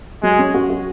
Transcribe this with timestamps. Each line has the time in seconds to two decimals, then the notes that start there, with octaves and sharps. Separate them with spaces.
0.23 F#3 G#3
0.39 C#4
0.54 F#4
0.70 F#4